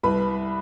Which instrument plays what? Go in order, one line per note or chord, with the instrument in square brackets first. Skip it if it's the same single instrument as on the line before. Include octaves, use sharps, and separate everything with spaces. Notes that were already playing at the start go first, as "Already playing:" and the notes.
[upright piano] C2 B4 B5